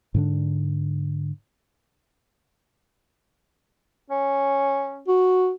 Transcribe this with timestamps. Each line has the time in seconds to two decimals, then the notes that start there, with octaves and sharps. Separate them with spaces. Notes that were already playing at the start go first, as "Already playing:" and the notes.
0.14 G#2 D3 D4
4.10 C#4
5.08 F#4